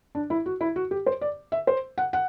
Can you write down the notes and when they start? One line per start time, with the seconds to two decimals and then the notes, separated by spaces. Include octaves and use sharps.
0.15 D4
0.30 E4
0.46 F#4
0.61 E4
0.76 F#4
0.91 G4
1.06 C5
1.21 D5
1.52 E5
1.67 C5
1.98 F#5
2.13 F#5